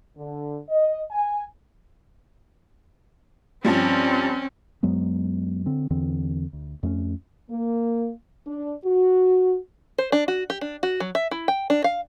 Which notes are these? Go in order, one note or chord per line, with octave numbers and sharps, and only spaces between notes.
D3
D#5
G#5
G2 F3 G3 C4 C#4
F#2 F#3 G#3 B3
D3 C4
E2 D3 E3 C4
D2
F2 A3 B3 C#4
A#3
D4
F#4
C5
D4
F#4
G4
D4
F#4
F#3
E5
E4
G5
D4
F5